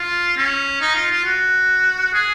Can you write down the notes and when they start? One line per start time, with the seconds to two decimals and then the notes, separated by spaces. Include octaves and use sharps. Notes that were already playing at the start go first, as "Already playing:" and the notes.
Already playing: F4
0.37 C#4
0.81 D#4
0.95 F4
1.11 F4
1.25 F#4
2.13 G#4